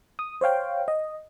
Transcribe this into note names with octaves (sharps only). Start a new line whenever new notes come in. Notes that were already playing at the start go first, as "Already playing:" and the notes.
D#6
C5 C#5 F5 G5
D#5